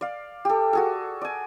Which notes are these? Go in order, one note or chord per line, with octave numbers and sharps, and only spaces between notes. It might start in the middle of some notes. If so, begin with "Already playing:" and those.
D5 F5
G4 A4
F#4 G#4 A4
D5 G#5